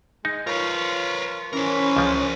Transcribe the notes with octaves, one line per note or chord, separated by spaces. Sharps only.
G#3 D#4
F3 F4 A#4 B4 C#5
E3 C#4 A#4 C5
C#2 F3